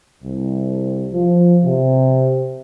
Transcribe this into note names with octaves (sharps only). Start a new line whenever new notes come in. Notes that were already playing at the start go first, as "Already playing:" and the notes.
C2
F3
C3